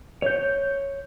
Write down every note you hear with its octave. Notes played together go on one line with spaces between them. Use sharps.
C#5 G6